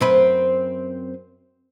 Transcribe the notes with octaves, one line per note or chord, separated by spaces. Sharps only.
F#2 C4 B4